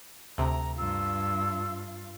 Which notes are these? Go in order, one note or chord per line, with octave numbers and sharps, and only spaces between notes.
D2 C3 A#5
G2 F4 E6